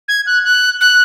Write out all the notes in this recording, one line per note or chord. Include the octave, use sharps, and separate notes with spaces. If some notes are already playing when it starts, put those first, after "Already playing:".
G#6
F#6
F#6
F#6